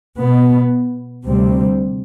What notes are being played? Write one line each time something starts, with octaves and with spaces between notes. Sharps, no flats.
B2 B3
D2 C3 G3 C4